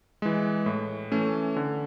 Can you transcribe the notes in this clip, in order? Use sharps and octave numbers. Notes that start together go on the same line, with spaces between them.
E3 G#3
A2
E3 A3 C#4
D3